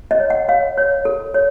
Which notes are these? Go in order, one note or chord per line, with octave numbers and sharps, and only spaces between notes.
D#5
C#5
F#5
C#5 F5
C#5
A4
C#5